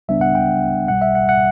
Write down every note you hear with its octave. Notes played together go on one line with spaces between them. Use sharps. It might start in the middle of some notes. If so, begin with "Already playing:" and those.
C#2 C#3 G3 B3 D4 E5
F#5
G5
B1 B2 G3 F#5
E5
F#5
F#5